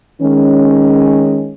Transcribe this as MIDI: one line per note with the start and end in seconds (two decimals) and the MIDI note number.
0.21 1.54 51
0.21 1.54 56
0.21 1.54 61